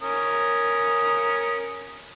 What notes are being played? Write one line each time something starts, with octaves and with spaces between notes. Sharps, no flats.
C#4 A#4 D#6